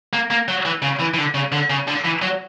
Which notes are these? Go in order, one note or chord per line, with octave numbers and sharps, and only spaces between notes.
A#3
A#3
F#3
E3
C#3
E3
E3
D3
C#3
D3
C#3
D3
E3
F#3